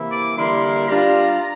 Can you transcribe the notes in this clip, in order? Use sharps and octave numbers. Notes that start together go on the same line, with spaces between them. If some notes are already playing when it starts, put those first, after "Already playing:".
Already playing: C3 E3 A#3 E4
D6
D3 G3 A#3 E4 A#4 C6
G3 D4 F4 A#5